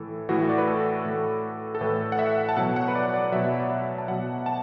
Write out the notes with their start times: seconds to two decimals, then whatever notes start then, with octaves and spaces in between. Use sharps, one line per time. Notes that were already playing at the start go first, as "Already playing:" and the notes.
Already playing: A2 E3 A4
0.29 A2 E3 F#4
0.49 D5
0.58 B4
0.68 A4
1.05 A2 E3
1.75 A4
1.81 A2 E3 B4
2.12 F#5
2.19 E5
2.49 A5
2.57 B2 F#3 F#5
2.76 F#5
2.88 B4
2.95 D5
3.14 D5
3.32 B2 F#3 E5
3.60 D5
3.71 E5
3.98 A5
4.08 B2 F#3 F#5
4.46 A5